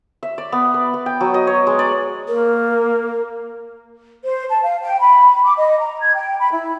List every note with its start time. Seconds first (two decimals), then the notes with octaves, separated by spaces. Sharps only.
0.23 E5
0.38 D5
0.52 B3
0.74 B4
0.94 B3
1.06 G5
1.21 F#3
1.34 D#5
1.47 C#5
1.67 G#3
1.79 D5
2.28 A#3 A#4
4.24 C5
4.49 A5
4.63 F5
4.82 G5
5.00 B5
5.45 D6
5.58 D#5
5.79 A#5
6.01 G#6
6.15 G5
6.39 B5
6.52 E4